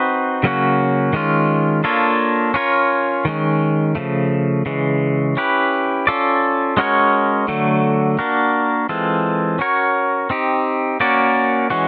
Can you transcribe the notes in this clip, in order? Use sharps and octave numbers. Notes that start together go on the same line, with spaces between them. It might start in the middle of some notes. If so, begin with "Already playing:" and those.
Already playing: C4 D#4 F#4 B4
C#3 F#3 A#3 C#4 F#4
D#3 G#3 C#4 F4
A#3 D4 F4 A4 C#5
C#4 F4 A#4 C#5
D#3 G#3 C#4
C#3 F3 A3
C#3 E3 G#3
C#4 E4 G4 B4
C#4 F4 A4 D5
G#3 C#4 F#4 A#4 C#5
D3 F#3 A3
A#3 D4 F#4 A#4
E3 G#3 C4 F4 A4
C#4 F#4 A#4 C#5
C4 D#4 G4
A#3 C#4 F#4 A#4 D5
E3 G#3 C#4 F#4